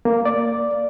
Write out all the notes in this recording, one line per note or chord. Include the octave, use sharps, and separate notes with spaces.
A#3
D5